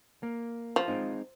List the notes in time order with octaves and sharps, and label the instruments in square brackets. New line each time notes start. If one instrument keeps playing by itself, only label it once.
[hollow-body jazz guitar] A#3
[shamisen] F3
[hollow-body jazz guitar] G#3 C4 D#4